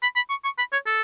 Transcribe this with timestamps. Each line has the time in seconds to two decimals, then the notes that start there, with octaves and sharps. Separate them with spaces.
0.03 B5
0.16 B5
0.30 C#6
0.44 C#6
0.58 B5
0.72 C#5
0.87 A4